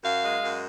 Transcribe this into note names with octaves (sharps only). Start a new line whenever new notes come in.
F#2 F5
G#3
F#2